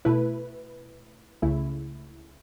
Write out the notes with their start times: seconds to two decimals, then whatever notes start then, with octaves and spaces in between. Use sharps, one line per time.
0.05 B2 A3 E4 B4
1.42 C#2 C#3 A3 E4